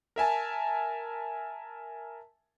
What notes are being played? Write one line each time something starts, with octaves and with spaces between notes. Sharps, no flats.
A#4 E5 G#5 A5